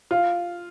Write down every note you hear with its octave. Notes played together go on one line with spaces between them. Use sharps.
F4